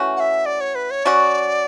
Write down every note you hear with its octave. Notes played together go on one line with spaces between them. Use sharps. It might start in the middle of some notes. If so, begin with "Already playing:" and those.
Already playing: E3 A3 C#4 F#4
F#5
E5
D5
C#5
B4
C#5
F#3 C#4 F#4 D5